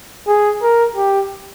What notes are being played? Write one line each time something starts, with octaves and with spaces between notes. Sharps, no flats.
G#4
A#4
G4